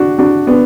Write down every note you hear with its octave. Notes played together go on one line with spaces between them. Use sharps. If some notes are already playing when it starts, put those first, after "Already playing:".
Already playing: D4 F#4
D4 F#4
B3 D4